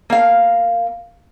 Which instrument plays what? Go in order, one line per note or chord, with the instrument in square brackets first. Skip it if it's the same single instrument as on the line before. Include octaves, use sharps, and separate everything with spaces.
[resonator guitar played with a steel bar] A#3 F5